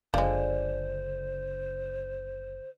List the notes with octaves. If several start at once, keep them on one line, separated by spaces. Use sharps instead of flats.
F#1 D3 F3 G#3 C5